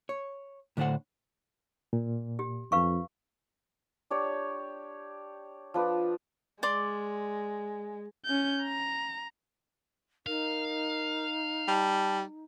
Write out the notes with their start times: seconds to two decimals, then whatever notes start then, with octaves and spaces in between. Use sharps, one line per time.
0.09 C#5
0.77 A2 D3 A3 D4 C5 F#5
1.93 A#2
2.39 G4
2.72 F2 B4 F5 C#6
4.10 D4 G4 C#5 D5
5.74 F3 D4 B4 D6
6.63 G#3 D5 C6 D6
8.25 C#4 G6
8.63 A#5
10.26 D#4 A#4 F5
11.68 G3 A5